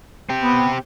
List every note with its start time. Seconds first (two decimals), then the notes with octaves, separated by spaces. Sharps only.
0.29 C4 G4
0.42 B3